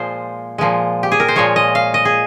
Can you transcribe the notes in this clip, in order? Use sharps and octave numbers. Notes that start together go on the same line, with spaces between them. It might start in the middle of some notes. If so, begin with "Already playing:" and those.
Already playing: A#2 F3 G#3 C5
A#2 F3 G#3
G4
G#4
A#4
C5
A#2 F3 G#3 C#5
D#5
F5
D#5
G#4